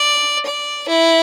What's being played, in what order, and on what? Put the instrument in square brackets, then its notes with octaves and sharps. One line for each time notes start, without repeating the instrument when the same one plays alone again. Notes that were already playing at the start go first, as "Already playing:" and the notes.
Already playing: [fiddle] D5
D5
E4